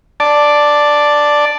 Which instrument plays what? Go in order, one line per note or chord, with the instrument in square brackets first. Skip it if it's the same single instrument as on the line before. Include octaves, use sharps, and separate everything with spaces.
[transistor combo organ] D5 A5